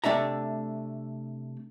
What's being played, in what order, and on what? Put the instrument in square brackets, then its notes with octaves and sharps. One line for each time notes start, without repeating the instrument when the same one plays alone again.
[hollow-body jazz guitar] C3 A3 D4 E5 A#5